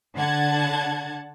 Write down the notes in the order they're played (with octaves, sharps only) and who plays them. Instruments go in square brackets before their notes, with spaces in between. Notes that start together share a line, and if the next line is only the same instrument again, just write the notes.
[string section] D3 F#5 A5 G#6